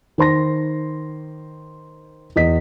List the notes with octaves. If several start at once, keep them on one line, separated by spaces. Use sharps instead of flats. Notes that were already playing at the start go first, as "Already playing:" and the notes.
D#3 C5 C6 A#6
E2 D#5 B6